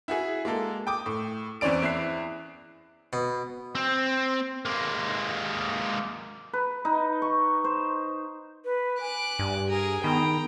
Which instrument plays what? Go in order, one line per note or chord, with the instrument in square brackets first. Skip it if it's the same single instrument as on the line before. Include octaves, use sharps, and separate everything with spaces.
[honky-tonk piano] E4 F#4 G#4
G#3 A#3 A4
G5 D6 D#6
A2
E2 E3 C4 C#4 D5 D7
E2 E4 F#6 C7
[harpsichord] B2
[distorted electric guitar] C4
G#3 A#3
[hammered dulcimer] B4
D#4
C#6
C5
[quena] B4
[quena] G#5 [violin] D6 F#6
[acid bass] G2
[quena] G#4 [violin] A#4 G#5
[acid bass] D#3 [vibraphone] B3 [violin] G5 A#5